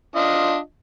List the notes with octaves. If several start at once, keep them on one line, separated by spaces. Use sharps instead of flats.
D4 F4 D#5